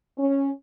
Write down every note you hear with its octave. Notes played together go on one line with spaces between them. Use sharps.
C#4